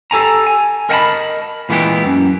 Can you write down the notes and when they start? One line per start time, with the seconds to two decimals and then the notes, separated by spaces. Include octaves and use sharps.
0.11 G4 A4 G#5 A#5
0.47 G#5
0.89 A#4 D#5 F#5 G5 A5 B5
1.69 A#2 E3 G#3 B3 E4 G4
2.05 F#2